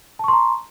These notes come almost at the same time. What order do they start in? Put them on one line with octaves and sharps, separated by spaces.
A5 C#6 C6 A#5